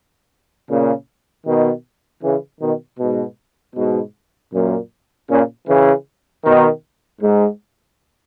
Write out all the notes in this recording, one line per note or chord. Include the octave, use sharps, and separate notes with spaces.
A#2 C#3
B2 D#3
C#3 E3
B2 D#3
G#2 B2
G#2 B2
F#2 A#2
A#2 C#3
C#3 E3
B2 D#3
G#2